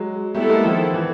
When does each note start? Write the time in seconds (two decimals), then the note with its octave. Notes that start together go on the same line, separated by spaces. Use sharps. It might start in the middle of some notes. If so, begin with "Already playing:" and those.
Already playing: F#3 G#3
0.34 G3 A3 B3 E4 A4
0.49 G#3 A#3
0.64 D#3 F3
0.94 D3 E3